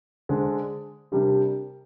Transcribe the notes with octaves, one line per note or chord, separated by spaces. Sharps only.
D3 G#3 D4 G#4 C5
C3 G3 D4 G4 A#4